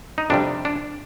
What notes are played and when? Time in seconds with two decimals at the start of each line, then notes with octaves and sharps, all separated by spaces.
0.18 D#4
0.30 F2 C3 G3 D4
0.65 D4